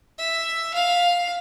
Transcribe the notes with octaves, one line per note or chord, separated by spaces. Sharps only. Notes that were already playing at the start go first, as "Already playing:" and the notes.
E5
F5